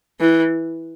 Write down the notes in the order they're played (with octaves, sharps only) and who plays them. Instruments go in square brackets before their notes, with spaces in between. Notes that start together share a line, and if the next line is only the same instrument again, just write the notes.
[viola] E3